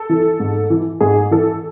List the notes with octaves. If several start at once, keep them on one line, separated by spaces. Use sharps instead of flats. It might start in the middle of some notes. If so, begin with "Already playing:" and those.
Already playing: A4
E3
G#2
E3
G#2 G#4
E3 A4